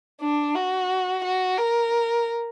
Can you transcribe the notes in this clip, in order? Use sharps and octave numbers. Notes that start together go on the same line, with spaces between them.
D4
F#4
F#4
A#4